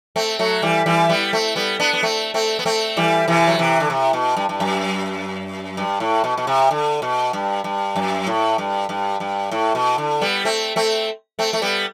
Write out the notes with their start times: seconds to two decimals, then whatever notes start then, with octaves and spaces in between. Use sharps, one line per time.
0.16 A3 C4
0.39 F#3 A3
0.62 E3 G3
0.86 E3 G3
1.09 G3 B3
1.33 A3 C4
1.56 G3 B3
1.79 B3 D4
1.93 B3
2.03 A3 C4
2.34 A3 C4
2.59 B3
2.66 A3 C4
2.97 E3 G3
3.28 C3 E3
3.47 F#3
3.59 C3 E3
3.80 D3
3.90 C3
4.13 B2
4.37 G2
4.49 G2
4.60 F#2
5.77 G2
6.00 A2
6.24 B2
6.38 B2
6.47 C3
6.71 D3
7.02 B2
7.33 G2
7.64 G2
7.96 F#2
8.27 A2
8.58 G2
8.89 G2
9.20 G2
9.51 A2
9.75 B2
9.98 D3
10.21 G3 B3
10.45 A3 C4
10.76 A3 C4
11.39 A3 C4
11.53 A3
11.62 G3 B3